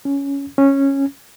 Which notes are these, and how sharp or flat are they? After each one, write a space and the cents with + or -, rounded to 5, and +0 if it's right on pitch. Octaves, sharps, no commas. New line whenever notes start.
C#4 +10
C#4 -10